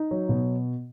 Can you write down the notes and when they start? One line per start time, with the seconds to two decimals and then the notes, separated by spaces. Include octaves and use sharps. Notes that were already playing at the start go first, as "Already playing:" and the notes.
Already playing: D#4
0.11 F#3
0.29 B2